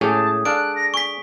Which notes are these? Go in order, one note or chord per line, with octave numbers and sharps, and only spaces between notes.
A2 C#4 G4 G#4 A5
D4 A4 F5 F#6 D7
A#6
G#5 C#6 B6